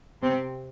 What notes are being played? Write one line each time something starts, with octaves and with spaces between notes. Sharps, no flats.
C3 C4